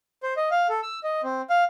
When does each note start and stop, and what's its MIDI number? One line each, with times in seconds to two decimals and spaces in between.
0.23 0.34 72
0.37 0.49 75
0.51 0.67 77
0.69 0.80 69
0.82 1.00 88
1.04 1.21 75
1.23 1.42 60
1.50 1.64 77